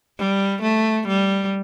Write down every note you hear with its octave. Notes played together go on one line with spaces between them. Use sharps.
G3
A3
G3